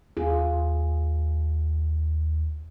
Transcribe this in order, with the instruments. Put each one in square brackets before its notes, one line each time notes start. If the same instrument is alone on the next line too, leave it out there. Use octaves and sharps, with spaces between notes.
[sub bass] D#2 [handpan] F4 G#4